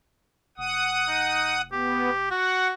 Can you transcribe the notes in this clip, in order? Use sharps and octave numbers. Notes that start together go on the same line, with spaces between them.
F1 F#5 D#6
D#4
B3 G4
F#4 F#5